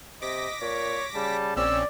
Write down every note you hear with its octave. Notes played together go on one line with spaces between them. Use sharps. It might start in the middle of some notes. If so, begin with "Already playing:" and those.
C3 D#5 D6 A#6 B6
A#2 C#5
C#3 G3 A5
A#1 C4 C#4 D5 E6